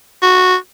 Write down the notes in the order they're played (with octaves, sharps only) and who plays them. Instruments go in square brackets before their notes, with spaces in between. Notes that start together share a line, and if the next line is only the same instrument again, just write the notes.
[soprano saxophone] F#4